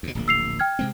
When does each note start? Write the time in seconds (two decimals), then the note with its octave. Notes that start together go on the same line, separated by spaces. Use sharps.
0.03 D#2 B2
0.15 D1 A#1 A#3
0.28 E6 C7 F7
0.60 G5 F6 G#6
0.79 C3 G#3 C4